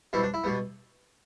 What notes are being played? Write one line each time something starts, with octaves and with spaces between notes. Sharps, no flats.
B2 G3 C4 E4
D4
E4
B2 G3 B3